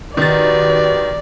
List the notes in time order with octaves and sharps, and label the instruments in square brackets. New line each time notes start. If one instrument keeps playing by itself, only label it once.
[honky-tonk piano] D#3 A6 [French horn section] F#4 G4 B4 [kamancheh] D5